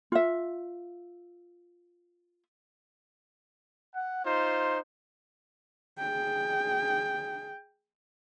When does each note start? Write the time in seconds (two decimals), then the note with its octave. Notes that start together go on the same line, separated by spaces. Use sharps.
0.12 F4 E5
3.95 F#5
4.24 D#4 F4 C5
5.98 G#4 G5